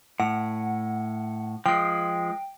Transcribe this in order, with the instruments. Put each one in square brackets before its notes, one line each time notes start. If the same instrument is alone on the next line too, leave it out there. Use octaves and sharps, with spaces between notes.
[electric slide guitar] A2 [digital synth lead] F#5
[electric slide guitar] F3 G#3 [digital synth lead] G5